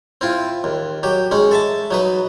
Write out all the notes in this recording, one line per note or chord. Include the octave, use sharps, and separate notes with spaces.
C4 E4 F4
D#2
F#3 G4
G#3 C#4 D#4
A4 E5 A5
F#3 D#4 B4